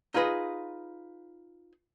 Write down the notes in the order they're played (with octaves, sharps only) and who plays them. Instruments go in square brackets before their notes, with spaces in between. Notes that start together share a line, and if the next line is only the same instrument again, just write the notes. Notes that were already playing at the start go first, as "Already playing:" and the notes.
[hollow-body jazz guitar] D#4 F4 G#4 B4 D#5